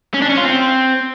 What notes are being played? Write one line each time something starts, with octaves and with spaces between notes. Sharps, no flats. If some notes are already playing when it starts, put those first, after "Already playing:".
C#4
D4
C#4
F4
C4